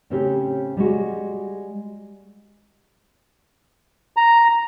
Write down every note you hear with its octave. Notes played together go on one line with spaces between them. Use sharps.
A2 C#3 C4 C#4 G4
G3 G#3 F#4
A#5